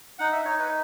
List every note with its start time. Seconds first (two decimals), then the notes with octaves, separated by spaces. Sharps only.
0.19 D#4 F#5
0.32 E5
0.45 D#4 C#5
0.59 B4